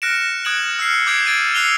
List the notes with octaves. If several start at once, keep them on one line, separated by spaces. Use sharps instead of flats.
F6 F#6 A#6 C#7 D7 E7
D#6 F#6 G#6 D7 E7 F#7
E6 F6 C7 C#7
D6 D#6 G6 G#6 C7 D7
G#6 A6 D7 D#7
E6 F#6 C7 C#7 F7 G7